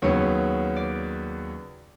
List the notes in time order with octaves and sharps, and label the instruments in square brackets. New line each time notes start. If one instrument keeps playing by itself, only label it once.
[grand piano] D#2 C#3 F#3 B3 [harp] C#5
[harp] D5